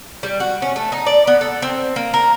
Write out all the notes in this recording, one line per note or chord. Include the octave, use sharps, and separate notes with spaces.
G3
F#4
C#4
A3
D#4
D5
B3
A4
C4
A#3
A#4